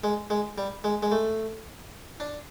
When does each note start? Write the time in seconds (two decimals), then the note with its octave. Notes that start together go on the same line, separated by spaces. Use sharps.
0.04 G#3
0.30 G#3
0.58 G3
0.84 G#3
1.03 G#3
1.12 A3
2.20 D4